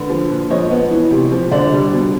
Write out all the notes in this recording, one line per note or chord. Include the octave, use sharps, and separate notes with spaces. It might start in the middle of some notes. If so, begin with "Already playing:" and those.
Already playing: D3 B4
F3
A#2
F3 C#5 D#5
B3
E3
C3
F3
D3 C5 D5
G3
B2